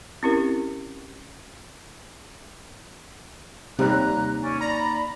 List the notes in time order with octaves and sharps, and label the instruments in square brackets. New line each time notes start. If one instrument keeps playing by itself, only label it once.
[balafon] C4 C#4 E4 G4 A#4
[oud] D#2 [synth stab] C3 G3 [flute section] A#5 F#6
[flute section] C#4 D5
[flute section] D5 B5 [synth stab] A#5